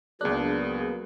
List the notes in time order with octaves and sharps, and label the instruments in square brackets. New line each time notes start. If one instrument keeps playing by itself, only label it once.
[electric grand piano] C#2 F#6 [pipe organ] F#3 A#3 B3 [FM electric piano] D4 [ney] G#4